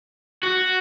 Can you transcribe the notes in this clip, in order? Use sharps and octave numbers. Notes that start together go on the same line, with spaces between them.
F#4